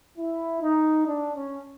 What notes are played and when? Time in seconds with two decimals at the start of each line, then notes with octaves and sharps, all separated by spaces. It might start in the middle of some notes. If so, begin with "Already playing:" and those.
0.17 E4
0.61 D#4
1.05 D4
1.34 C#4